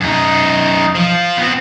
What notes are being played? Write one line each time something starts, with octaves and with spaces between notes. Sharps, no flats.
F#2 D#4
F3
B3 C4